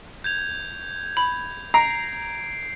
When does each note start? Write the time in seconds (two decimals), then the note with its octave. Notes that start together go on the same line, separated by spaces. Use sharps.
0.24 G6 G#6 F7
1.17 B5
1.74 A#5 C7 D7